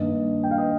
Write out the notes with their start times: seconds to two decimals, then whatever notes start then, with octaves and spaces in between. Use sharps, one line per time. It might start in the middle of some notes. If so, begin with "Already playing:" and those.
Already playing: G2 D#3 A#3 D#5
0.43 G5
0.51 F5
0.58 D#5